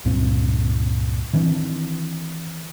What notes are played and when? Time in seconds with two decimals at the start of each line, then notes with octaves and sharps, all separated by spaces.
0.05 C#2 G2 A#2 C4
1.33 D#3 E3 C4 D4